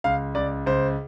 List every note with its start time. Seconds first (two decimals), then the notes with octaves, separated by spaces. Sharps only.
0.04 C#2 F5
0.35 C#2 D5
0.66 C#2 C5